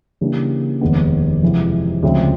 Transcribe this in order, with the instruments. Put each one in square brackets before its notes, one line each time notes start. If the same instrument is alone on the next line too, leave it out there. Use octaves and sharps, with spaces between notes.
[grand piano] C#3 E3 G3 A#3 D4
F1 D#2 D#3 G#3 B3
F2 C3 E3 G#3
D2 C#3 F3 G#3 C4